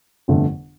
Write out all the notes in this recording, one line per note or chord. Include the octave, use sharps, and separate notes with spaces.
G1 F2 D3 A3